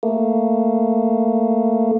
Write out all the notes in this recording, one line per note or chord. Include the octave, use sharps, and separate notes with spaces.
A3 A#3